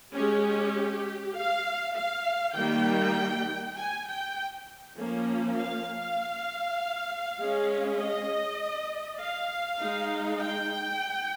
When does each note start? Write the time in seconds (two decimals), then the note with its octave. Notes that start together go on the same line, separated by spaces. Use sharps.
0.13 G#3 C#4 G4
0.44 G4
1.35 F5
1.95 F5
2.56 D#3 G3 A#3 G5
3.77 G#5
4.06 G5
4.96 F3 A#3 C#4
5.58 F5
7.39 G#3 C#4
7.99 D#5
9.20 F5
9.80 G#3 D#4
10.40 G5